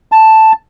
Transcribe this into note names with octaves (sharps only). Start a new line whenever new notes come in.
A5